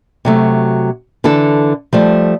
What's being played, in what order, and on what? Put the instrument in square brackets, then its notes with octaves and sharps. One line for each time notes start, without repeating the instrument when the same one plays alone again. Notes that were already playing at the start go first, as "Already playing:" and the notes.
[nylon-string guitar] C3 F#3 A3
D3 E3 E4 A4
F3 G3 A3